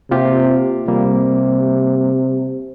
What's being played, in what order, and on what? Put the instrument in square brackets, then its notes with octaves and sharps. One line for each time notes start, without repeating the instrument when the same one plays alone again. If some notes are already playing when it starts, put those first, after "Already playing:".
[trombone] C3 [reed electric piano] A#3 F4 G4
[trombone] C3 [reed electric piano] G3 A#3